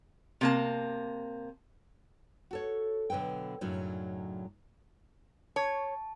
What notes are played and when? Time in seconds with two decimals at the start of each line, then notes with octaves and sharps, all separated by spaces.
0.41 C3 A#3 A5
2.51 F#4 A4 C#5
3.10 B2 D3 F#3 B4 G5
3.61 F#2 A2 C#3 F#3 D4 D#4
5.56 C#5 A5